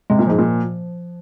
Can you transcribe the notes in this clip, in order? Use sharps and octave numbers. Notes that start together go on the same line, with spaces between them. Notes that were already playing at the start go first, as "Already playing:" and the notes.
C3 G#3
A#2
G#2 F3
A#2